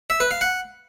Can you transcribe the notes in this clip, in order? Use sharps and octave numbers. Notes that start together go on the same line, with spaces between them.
E5
B4
F5
F#5